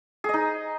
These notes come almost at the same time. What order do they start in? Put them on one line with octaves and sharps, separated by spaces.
G#4 D#5 D#4